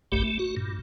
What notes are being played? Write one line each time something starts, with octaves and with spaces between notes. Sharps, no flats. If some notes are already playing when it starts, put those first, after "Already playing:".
F#1 B1 G2 A3 G4
A3
F#4
G2 A#2